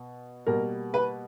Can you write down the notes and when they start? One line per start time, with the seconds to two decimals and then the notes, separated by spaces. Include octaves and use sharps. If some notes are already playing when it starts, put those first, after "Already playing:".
Already playing: B2
0.46 B2 G3 A#3 A#4
0.94 B4